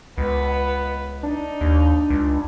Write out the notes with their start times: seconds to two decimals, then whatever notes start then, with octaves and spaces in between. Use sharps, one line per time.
0.18 C#2 B3 B4
1.23 D4 D#4
1.61 D#2
2.10 C#2